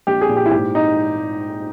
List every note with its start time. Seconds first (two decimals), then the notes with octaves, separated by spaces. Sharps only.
0.07 A#1 G4
0.21 G#4
0.29 A#2
0.36 G4
0.46 E4
0.51 G#2 G4
0.75 D#4